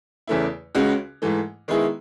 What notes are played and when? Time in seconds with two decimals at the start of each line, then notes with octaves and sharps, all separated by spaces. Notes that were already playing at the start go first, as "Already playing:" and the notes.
0.27 E2 C#3 E3 A3 E4
0.75 C#2 C#3 G#3 C#4 F#4
1.22 G#2 E3 A3
1.68 D#3 G#3 B3 E4 G#4